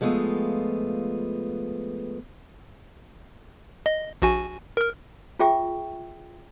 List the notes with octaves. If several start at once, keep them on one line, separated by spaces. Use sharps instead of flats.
F3 G#3 A3 B3 F4
D#5
A#1 F#4 G#5
A#4 F6
F4 G#4 E5 G5 C#6